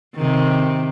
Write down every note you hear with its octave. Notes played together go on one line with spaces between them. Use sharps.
C3 D#3